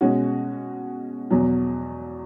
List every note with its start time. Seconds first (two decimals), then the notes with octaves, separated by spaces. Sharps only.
0.01 B2 G#3 C#4 F#4
1.31 E2 B2 F#3